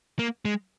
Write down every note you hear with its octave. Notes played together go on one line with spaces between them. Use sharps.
A#3
G#3